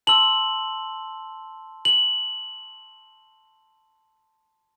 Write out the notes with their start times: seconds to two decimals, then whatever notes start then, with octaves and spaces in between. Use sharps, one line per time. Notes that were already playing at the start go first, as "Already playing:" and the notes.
0.07 A5 C6 E6 F#7
1.85 F#7